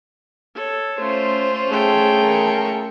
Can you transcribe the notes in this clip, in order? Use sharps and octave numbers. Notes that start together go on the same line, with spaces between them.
A4 C#5
A3 C#4 F4 C5
A3 G#4 G5 A5
A#4 C#6